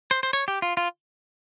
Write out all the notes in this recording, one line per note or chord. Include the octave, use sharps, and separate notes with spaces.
C5
C5
C#5
G4
F4
F4